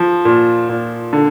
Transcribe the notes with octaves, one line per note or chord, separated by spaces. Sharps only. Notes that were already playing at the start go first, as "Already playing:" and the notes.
Already playing: F3
A#2
A#2
D3